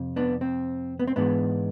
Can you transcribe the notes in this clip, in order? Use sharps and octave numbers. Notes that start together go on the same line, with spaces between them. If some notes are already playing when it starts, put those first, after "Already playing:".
Already playing: F2 C3
B3 D4
C4
B3
C4
G#2 E3 G#3 B3 D4